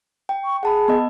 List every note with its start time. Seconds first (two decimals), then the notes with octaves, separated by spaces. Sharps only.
0.29 G5
0.45 C#6
0.63 G#4 F#5 A5 B5
0.88 B3 D#5